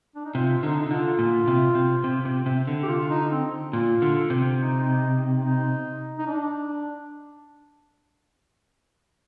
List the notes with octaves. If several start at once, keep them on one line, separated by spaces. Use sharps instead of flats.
D4
D#4
C3 F4
D3 D#4
D#4
D3 F4
A#2
C3
C3
C3
C3
C3
D3
G4
F4
F4
D#4
C4
A#2 F4
D3
C3
D#4
D#4
D#4
D4